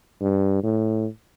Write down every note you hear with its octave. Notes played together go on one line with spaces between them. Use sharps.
G2
A2